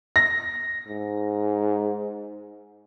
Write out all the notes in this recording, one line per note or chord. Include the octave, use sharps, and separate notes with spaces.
A#6
G#2